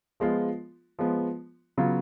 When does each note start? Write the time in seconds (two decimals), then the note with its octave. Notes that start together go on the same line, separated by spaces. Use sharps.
0.20 F3 G#3 B3 F4
0.99 F3 G#3 B3
1.77 C#3 F#3 B3 F4